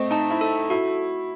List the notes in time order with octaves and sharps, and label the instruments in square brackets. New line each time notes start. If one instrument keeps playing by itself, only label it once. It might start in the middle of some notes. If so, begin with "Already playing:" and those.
Already playing: [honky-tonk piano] A3 C4 [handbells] D#5
[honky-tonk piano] D#4 [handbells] A5
[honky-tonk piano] E4
[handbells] A4
[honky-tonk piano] E4 [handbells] F#4